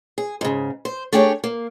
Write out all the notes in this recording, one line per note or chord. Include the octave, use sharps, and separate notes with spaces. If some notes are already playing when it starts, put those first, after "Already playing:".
G#4
G#2 C#3
C5
A3 D4 G4 G#4 C#5
A#3